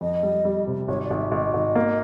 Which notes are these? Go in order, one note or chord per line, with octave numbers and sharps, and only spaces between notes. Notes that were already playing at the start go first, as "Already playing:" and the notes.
F2 D#5
G3
G3
C3
G#1 C#5
D5
G#1
E5
G#1 D#5
G#1
A#3